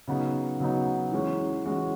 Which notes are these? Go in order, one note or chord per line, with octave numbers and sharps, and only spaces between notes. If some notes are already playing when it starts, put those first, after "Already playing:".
C#3 F#3 B3 D#4
C#3 F#3 B3 D#4
E3 G#3 C#4 F#4
E3 G#3 C#4 F#4